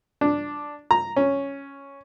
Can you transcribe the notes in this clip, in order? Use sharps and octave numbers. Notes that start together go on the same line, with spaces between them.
D4
A#5
C#4